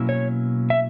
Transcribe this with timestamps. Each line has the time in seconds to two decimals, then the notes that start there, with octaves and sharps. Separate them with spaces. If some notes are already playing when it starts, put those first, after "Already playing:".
Already playing: B2 F#3 A#3 C#4 E4
0.09 C#5
0.70 E5